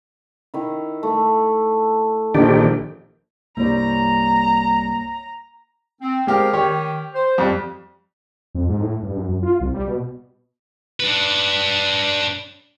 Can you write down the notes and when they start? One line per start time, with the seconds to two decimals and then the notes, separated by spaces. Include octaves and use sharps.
0.54 D#3 E4
1.03 A3
2.35 A#1 D#3 D4 G4 G5
3.57 C2 G2 G3 A#3 C#5 A#5
6.02 C4
6.27 F3 G#3 G4 A#4 F5
6.53 D#3 G4 C#5
7.14 C5
7.38 F2 G3
8.55 F2
8.69 G#2
8.81 A2
9.03 G2
9.16 F#2
9.29 F#2
9.43 F4
9.60 C2
9.74 G3
9.87 B2
11.00 D4 B4